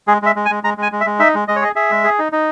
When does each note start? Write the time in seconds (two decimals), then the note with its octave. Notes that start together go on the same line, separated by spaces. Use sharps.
0.08 G#3 G#4
0.22 G#3 E5
0.36 G#3
0.46 G#5
0.50 G#3
0.63 G#3 A#5
0.78 G#3 G#5
0.92 G#3
1.01 E5
1.06 G#3
1.19 D#4 E5
1.35 G#3
1.48 G#3 D#5
1.56 C#5
1.62 G#4 D#5
1.76 G#4 E5
1.91 G#3
2.04 G#4
2.19 D#4
2.32 D#4